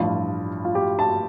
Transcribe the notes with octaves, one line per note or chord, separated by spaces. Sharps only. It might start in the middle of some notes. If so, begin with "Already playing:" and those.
Already playing: A1 G2 F3 F4
F4
G4
A5